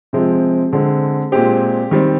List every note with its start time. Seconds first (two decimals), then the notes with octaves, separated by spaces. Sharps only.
0.13 C3 F3 G#3 C4
0.73 D3 G#3 C4
1.32 A#2 G#3 C4 G4
1.91 D#3 G3 C4